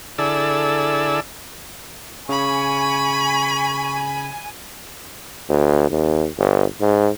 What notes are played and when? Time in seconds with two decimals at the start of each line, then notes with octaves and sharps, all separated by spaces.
0.18 D3 E4 G#4 A4 D5 E6
2.29 C#3 G#5 B5 C#6
5.49 D2
5.90 D#2
6.38 G1
6.81 G#2